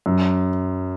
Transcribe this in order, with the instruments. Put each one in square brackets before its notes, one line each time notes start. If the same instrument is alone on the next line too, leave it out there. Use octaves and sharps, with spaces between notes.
[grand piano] F#2